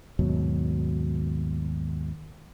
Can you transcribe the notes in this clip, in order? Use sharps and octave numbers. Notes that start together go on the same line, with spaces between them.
D#2 G#2 B2 F#3